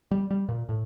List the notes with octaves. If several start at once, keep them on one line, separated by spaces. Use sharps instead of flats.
G3
G3
A#2
A2